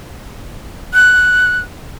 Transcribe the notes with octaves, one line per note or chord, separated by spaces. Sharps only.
F#6